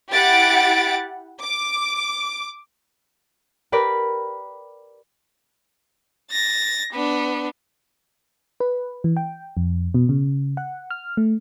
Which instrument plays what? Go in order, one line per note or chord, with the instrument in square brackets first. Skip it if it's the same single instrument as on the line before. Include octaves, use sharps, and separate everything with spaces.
[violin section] E4 G4 F#5 A6 D7
D6
[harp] G4 A#4 B4 D5 B5
[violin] A6 A#6
B3 D4
[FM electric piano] B4
E3
G5
F2
B2
C#3
F#5
F6
A3